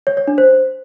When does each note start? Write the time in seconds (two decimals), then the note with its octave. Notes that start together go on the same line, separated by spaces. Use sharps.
0.07 C#5
0.17 C#5
0.27 D4
0.38 C5